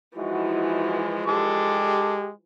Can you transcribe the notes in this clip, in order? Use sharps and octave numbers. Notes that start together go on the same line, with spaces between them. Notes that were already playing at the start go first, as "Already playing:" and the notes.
E3 F3 G#3 D#4 E4 F#4
G#3 G4 A4 D6